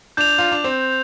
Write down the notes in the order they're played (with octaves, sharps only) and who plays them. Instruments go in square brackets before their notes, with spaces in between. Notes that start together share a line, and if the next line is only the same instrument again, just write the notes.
[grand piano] D4 [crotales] G6 F7
[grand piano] F4
D4
C4